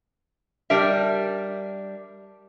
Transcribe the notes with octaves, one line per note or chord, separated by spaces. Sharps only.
G3 D4 A#4 E5